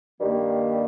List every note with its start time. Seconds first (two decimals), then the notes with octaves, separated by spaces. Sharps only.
0.20 G2 D#3 G3 A#3